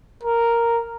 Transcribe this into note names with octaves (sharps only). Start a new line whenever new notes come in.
A#4